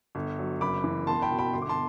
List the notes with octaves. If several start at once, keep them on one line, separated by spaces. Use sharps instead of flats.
G1
F#3
F#1 B5 D6
E3
E1 A5 C6
G5 B5
B2
G5 B5
G1 C6
D6
A5 C6